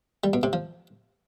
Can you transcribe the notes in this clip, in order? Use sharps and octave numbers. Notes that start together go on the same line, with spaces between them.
G3
B2
C3
F3